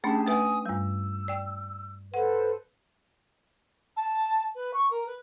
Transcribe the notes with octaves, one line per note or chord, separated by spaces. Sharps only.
A3 C#4 D4 G4 G#4 A5
A3 B4 E5 G#5 D#6
G2 G3 E6
D5 G5
A4 B4 C5 F#5
A5
B4
C#6
A#4
B4